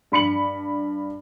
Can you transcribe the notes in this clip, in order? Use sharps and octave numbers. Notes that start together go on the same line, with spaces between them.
G2 B5 C#7 F#7